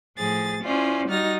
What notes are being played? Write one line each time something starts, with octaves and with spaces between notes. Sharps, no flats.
A2 F3 G#4 A6
C#4 E4 F4 C5 D5
G3 D#4 F#4 F6 A6 A#6